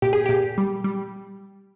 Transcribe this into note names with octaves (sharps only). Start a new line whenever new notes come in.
A#2 G4
G#4
A#2 G4
G3
G3